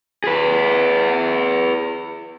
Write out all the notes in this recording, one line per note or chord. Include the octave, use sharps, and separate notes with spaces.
G#4 B4